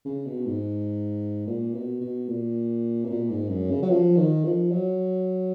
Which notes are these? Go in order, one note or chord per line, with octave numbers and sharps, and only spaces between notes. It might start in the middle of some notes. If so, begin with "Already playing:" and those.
C#3
B2
G#2
A#2
B2
B2
A#2
B2
A#2
G#2
F#2
C#3
F#3
F3
D#3
F3
F#3